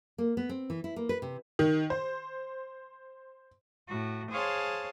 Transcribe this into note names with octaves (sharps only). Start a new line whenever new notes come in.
A#3
B3
C4
E3
E4
A#3
B4
C3
D#3
C5
A2 F#4
G#4 C5 C#5 F5 A5 C6